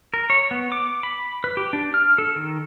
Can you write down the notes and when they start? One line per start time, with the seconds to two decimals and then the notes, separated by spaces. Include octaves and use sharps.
0.14 A#4
0.30 C#5
0.51 B3
0.72 D6
1.03 B5
1.44 B4
1.57 G4
1.73 D4
1.94 F6
2.18 A4
2.36 D#3